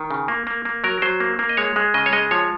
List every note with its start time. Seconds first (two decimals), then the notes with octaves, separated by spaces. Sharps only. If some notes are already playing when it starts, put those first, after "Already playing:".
Already playing: D#3
0.11 C#3
0.28 A#3
0.47 A#3
0.65 A#3
0.84 F#3 A#4
1.02 F#3 C5
1.20 A#3
1.39 A#3
1.49 D#5
1.57 G#3 C#5
1.76 G#3
1.94 C#3 D#5
2.06 C#5
2.13 G#3 D#5
2.31 F3 C#5